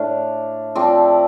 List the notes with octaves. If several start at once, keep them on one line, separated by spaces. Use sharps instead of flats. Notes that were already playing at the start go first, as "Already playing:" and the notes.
Already playing: A2 A3 D4 F5
F3 A3 C4 D5